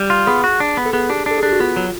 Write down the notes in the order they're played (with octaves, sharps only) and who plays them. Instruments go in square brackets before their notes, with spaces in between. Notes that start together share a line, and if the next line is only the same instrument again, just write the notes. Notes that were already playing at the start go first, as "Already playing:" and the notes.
Already playing: [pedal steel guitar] G3 [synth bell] G4
[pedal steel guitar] F4
[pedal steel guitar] B3 [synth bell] G#4
[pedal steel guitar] F#4
D4
B3
[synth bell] A4
[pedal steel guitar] B3 [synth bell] G#4
[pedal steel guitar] D4 [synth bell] G4
[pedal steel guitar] D4 [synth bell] A4
[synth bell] G#4
[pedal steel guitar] D4 [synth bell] G4
[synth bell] F#4
[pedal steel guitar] B3 [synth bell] F4
[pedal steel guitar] F#3